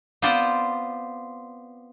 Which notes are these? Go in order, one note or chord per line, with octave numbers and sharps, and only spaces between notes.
B3 C4 F4 C5 D5